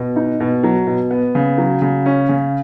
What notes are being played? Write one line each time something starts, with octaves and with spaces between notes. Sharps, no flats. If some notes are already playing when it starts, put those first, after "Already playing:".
Already playing: B2
D#4
B2
F#3
B2
B3
C#3
F#3
C#3
C#4
C#3